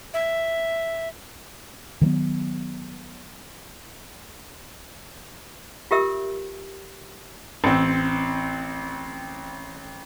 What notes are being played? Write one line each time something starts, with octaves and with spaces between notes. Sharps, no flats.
E5
D#3 F#3 G3 B3
F4 G4 A#4 E5 E6
A1 C4